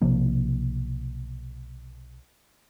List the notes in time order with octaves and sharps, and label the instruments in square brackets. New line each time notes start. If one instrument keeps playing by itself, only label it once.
[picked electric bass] B1 C3 F3 A#3